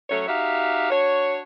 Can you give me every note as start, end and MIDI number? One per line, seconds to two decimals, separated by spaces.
0.10 0.24 54
0.10 0.24 57
0.10 0.24 61
0.10 0.24 73
0.27 0.88 63
0.27 0.88 66
0.27 0.88 67
0.27 0.88 76
0.27 0.88 77
0.90 1.41 62
0.90 1.41 66
0.90 1.41 73